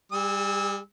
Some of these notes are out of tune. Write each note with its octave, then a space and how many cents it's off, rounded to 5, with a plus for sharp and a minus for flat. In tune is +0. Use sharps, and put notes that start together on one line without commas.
G3 +25 G#4 -25 E6 -30